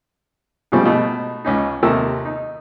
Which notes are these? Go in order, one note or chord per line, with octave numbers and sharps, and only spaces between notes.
G#2 C#3 F3 G3 A3 C4
B2 A3 D#4
C#2 C#4 D#4
D#2 C3 A4 A#4 E6
D#4